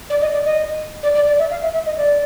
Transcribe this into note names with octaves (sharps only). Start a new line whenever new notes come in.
D5
D#5
D5
D#5
D5
D5
D5
E5
F5
E5
E5
D#5
D5